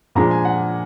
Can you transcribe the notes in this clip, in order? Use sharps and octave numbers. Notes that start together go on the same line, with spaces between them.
A#2 F3 G#3 D4 A#5
G#5
F#5